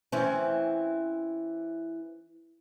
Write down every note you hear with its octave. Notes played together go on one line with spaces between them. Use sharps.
E3 C4 C#4